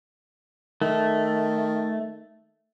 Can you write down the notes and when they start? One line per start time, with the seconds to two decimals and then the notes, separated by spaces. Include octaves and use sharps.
0.82 D#3 A3